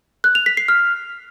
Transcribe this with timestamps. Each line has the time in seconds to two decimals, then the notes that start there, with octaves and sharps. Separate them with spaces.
0.24 F#6
0.35 F7
0.46 B6
0.57 C7
0.68 F6